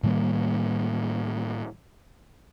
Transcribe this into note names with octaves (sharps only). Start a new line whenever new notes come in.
A2 D#3 G3 A#3